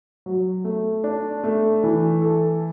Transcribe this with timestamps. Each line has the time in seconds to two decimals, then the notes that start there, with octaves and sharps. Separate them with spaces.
0.26 F#3
0.65 A3
1.04 D4
1.44 A3
1.84 E3
2.22 A4